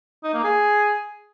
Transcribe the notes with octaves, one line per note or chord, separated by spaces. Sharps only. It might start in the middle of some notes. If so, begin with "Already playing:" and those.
D#4
A#3
G#4